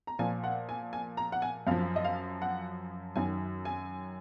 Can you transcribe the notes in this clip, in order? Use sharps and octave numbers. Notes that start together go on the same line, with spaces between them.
A#5
A#2 F3 G#5
F#5
G#5
G#5
A#5
F#5
G#5
F#2 F3 F5
D#5
F5
F#5
F#2 D#3 F#3 G#5
G#5